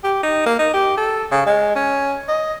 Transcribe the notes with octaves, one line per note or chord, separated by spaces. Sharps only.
G4
D#4
A#3
D#4
G4
A4
C#3
G#3
C#4
D#5